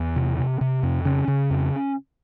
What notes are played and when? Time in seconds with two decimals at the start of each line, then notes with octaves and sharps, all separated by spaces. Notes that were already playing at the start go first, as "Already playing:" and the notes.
Already playing: E2
0.16 C3
0.39 C3
0.61 C3
0.83 F2
1.05 C#3 C#4
1.28 C#3
1.50 F2